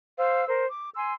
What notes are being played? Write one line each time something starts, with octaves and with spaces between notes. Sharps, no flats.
C5 F5 E6
A#4 C5
D6
G#5 C6 E6